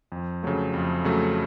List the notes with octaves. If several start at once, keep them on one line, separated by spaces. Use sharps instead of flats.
F2
C#3 F#3 A3
F2
C#3 F#3 A3